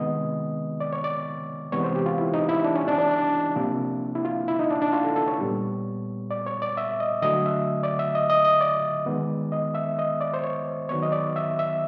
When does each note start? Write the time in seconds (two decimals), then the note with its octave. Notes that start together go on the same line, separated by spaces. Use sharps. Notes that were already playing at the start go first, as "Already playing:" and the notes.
Already playing: C3 D#3 G#3 B3 D#5
0.80 D5
0.93 C#5
1.04 D5
1.72 C3 E3 G#3 B3 C#5
1.84 C5
1.95 G4
2.06 F4
2.18 E4
2.34 D#4
2.49 E4
2.64 D4
2.75 C#4
2.88 D4
2.98 D4
3.09 D4
3.56 C3 F3 A#3
4.15 E4
4.25 F4
4.48 E4
4.59 D#4
4.70 D4
4.82 D4
4.93 F4
5.04 A4
5.16 A4
5.28 C#5
5.40 A#2 G3 B3
6.31 D5
6.46 C#5
6.62 D5
6.77 E5
7.00 D#5
7.22 D3 F#3 A3 D#5
7.46 E5
7.83 D5
7.99 E5
8.15 D#5
8.30 D#5
8.45 D#5
8.61 D5
9.06 D#3 G#3 B3
9.52 D#5
9.75 E5
9.99 D#5
10.21 D5
10.34 C5
10.44 C#5
10.89 D#3 F#3 B3 C#5
11.02 D#5
11.12 D5
11.36 E5
11.59 E5